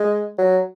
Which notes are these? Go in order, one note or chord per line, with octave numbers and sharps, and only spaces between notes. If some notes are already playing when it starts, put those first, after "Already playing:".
Already playing: G#3
F#3